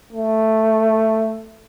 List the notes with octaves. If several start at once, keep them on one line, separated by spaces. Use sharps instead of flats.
A3